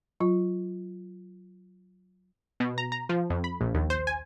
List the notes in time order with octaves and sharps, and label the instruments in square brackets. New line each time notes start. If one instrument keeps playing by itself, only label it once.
[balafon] F#3 F4
[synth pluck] B2
A#5
A#5
F3
F2
B5
A#1
D#2
C5
G#5